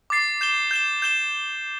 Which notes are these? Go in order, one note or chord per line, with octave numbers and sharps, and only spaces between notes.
D6 A6 C7
G6 E7 G7
G6 E7 G7
G6 E7 G7